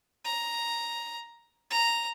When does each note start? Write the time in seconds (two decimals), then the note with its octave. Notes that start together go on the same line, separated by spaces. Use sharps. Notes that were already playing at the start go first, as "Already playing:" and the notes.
0.24 A#5
1.70 A#5